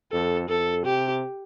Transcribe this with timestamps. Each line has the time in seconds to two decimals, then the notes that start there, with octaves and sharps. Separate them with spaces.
0.12 F2 A4
0.49 F2 A4
0.85 C3 G4